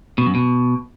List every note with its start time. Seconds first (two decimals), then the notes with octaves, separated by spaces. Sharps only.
0.18 B2
0.26 F#2
0.35 B2